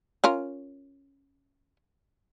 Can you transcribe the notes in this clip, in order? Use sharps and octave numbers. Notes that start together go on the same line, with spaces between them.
C#4 F4 A#4